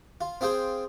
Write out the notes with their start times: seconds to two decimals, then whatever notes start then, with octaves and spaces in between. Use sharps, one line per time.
0.21 F4
0.41 C4 F4 G#4 C5 G5